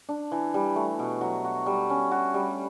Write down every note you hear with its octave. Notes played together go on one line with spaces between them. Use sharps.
D4
E3
G3
A3
B2
F#3
F#4
G3
C#4
F#4
G3